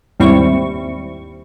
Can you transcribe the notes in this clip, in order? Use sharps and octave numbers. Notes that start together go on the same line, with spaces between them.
D#2 G#2 G3 C4 E4 C#6